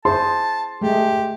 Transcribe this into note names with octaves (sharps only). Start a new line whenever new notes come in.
E4 G#4 C5 A5 C6
G#3 A3 G4